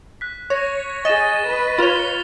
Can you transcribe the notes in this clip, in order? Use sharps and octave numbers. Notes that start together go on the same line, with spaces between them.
F#6 B6
C#5 C#6 A#6
G#4 D#5 A6 E7
B4
F4 C#5 A6 F7 G7